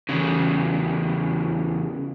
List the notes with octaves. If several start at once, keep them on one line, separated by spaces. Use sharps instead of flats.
E2 C#3